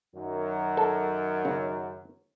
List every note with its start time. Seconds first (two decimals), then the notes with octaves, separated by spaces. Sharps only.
0.15 F#2 D#3 F#3
0.77 A4
1.45 C#3